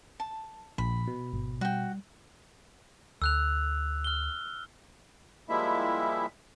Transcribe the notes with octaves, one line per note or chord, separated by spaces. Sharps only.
A5
A#1 B5
B2
G#1
G3 F#4 G5
D2 E6 F#6 F7
F6 G7
F3 G3 G#3 A#3 E4 E5